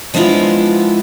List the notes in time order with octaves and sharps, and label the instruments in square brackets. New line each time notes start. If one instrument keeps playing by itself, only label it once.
[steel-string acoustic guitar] F3 G#3 B3 D4 E4 F4